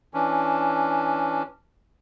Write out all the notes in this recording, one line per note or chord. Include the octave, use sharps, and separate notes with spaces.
E3 C#4 D4